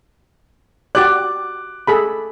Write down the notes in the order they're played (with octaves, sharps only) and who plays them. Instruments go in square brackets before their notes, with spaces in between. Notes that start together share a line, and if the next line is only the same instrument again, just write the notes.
[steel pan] F#4 G4 D5 [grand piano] D6 F#6
[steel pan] G#4 A4 B5